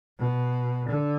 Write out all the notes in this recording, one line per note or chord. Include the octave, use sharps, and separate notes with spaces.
B2
D3